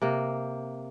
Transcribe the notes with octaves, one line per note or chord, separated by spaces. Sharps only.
C3 A#3